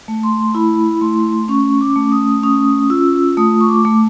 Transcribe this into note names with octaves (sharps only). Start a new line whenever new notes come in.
A3
C6
E4 B5
A3 C6
C#4 C#6
D6
A3
D#6
C#4 D#6
F4 E6
A3 D#6
C#6
D6
A3